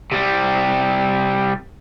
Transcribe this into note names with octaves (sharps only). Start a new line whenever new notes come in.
C3 G3